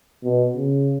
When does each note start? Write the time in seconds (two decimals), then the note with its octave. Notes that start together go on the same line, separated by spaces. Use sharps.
0.24 B2
0.56 C#3